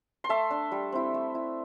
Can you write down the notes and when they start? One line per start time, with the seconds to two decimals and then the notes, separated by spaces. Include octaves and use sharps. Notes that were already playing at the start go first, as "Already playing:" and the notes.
0.24 C6
0.29 A3 E5 A5
0.51 D4
0.72 G3
0.92 C4 E4
1.14 A3
1.35 E4